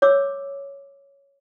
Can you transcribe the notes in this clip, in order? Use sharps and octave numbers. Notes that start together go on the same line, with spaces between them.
C#5 D6 E6